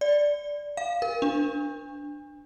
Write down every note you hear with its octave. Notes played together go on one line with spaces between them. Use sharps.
D5
F5
A#4
D4